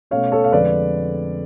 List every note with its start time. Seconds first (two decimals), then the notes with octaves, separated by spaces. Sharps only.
0.11 B2 A3 C#4 C#5 F5
0.32 A4 C#5
0.44 F5
0.52 F2 D3 G#3 B4 D5